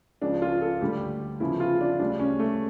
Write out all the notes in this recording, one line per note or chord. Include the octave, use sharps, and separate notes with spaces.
C#2 C#3 F3 D4
F4
A4
D2 D3 G3 G4
E2 C#3 F3 E4
F4
D4
D2 C#3 G3 D4
C#4
A3